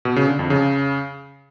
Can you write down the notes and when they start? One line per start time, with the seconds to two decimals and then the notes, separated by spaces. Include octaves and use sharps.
0.05 B2
0.16 C#3
0.28 D3
0.39 F2
0.50 C#3